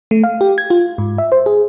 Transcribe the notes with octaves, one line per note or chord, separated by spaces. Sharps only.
A3
F5
G4
G#6
F4
G#2
E5
C5
G#4